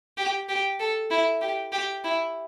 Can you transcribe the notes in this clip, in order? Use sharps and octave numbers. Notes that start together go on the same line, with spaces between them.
G4
G4
A4
E4
G4
G4
E4